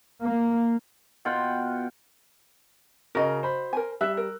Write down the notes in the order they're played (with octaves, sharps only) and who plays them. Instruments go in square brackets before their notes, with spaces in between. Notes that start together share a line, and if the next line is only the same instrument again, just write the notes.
[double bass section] A#3
[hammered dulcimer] B2 F4 F#5 G5
[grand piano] C#3 A#4 [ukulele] F#4 D#5
[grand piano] C5 B5
[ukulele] A#4 G#5
[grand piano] G3 E6 F#6 [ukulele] E5
[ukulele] A#4